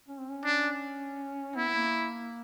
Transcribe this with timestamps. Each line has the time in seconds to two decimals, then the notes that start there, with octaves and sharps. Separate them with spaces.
0.08 C#4
0.19 C4
0.30 C#4
0.45 D4
1.56 B3 E4
1.68 B3
1.75 A#3